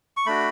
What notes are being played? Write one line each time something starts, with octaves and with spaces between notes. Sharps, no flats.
C#6
A3 D4 F#4 B5